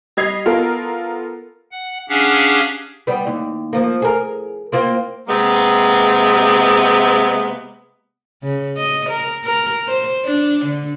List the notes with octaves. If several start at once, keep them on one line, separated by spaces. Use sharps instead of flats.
G3 D#5 G#6 C7 F7
B3 F4 A4 A#4
F#5
C#4 D4 G4 G#4 F5 F#5
G3 B3
D#2
F3 A#3
G#4 A#4
A#3 C4 F4
C3 G#3 A#3 B3
C#3
D#5
A#4
A#4
C5
D4
D3